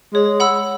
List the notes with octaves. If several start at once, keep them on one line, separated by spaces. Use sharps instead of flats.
G#3 C#5
F#5 B5 E6